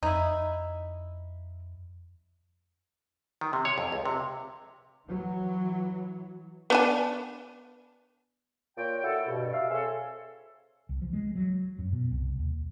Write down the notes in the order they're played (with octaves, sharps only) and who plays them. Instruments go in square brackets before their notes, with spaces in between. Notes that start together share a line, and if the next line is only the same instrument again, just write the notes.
[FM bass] F2 [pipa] D#4 E4
[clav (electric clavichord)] D#3
C3
C#5
F2
C#2
C3
[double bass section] E3 F#3
[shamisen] B3 D4 G#5
[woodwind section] A#2 C#5 G5
E4 F#4 A4
G2 B2
E5 F5
C4 G#4 A4 C#5 E5
[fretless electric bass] C2
F3
G#3
F#3
F#2
B2
C2
D#2